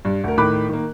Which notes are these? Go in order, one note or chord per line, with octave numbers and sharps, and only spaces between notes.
G2
D2 A#4
A2 D#3 B5 D6 F#6
D#3 A#3